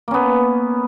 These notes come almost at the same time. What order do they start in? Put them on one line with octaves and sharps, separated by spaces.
A#3 C#4 B3